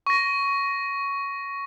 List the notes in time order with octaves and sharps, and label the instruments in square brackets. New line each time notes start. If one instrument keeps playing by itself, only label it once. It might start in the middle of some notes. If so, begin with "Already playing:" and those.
[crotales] C#6 A#6